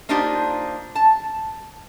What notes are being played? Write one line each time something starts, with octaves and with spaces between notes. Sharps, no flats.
A#3 D4 D#4 F4 G4 C5
A5